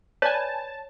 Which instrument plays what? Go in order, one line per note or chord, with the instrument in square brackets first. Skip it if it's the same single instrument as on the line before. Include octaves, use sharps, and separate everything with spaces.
[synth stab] B4 G#5 [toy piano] C#5 [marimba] D5 [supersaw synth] A5